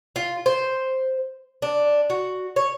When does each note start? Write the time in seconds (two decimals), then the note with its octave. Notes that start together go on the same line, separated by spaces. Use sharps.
0.16 F4
0.46 C5
1.62 D4
2.10 F#4
2.56 C#5